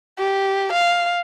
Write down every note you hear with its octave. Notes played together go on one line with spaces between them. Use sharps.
G4
F5